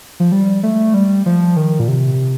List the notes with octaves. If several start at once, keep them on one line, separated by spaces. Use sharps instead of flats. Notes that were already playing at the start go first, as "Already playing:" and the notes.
F3
G3
A3
G3
F3
D#3
A#2
C3